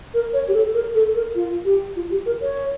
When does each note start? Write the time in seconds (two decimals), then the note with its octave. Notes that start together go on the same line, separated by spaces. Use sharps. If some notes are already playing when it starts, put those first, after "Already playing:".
0.14 A#4
0.33 C#5
0.48 G4
0.54 A4
0.74 A#4
0.94 A4
1.15 A#4
1.35 F4
1.65 G4
1.96 F4
2.11 G4
2.26 A#4
2.42 C#5